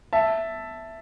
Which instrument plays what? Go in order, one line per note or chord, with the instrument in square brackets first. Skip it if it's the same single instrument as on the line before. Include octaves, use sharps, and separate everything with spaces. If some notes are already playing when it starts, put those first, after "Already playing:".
[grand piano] E5 A5